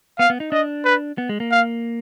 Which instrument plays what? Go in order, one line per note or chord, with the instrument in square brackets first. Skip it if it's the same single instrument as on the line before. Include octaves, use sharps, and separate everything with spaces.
[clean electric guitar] B3 [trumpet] F5
[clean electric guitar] B3
D#4
[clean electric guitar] D4 [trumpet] D#5
[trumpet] B4
[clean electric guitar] B3
G#3
A#3
[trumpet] F5